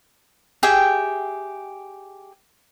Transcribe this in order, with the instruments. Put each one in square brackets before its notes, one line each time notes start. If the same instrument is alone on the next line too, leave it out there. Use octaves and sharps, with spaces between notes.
[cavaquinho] G4 G#4 E5 G5